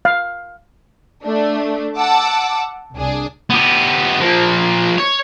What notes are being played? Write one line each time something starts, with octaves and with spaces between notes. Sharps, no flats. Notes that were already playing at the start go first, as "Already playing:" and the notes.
F5
A3 D4
F#5 A5 D6 E6
C2 D4 G#4
B3 G4
F3 A#3
C#5